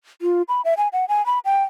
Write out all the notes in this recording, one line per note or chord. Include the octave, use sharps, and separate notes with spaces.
F4
B5
E5
G#5
F#5
G#5
B5
G5